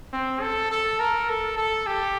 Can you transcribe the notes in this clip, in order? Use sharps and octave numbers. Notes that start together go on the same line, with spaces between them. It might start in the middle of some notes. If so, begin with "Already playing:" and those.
C4
A4
A4
A#4
A4
A4
G4